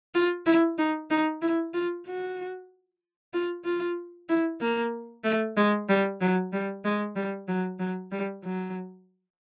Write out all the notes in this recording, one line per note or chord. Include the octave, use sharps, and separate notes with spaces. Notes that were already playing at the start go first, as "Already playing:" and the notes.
F4
E4
D#4
D#4
E4
F4
F#4
F4
F4
E4
A#3
A3
G#3
G3
F#3
G3
G#3
G3
F#3
F#3
G3
F#3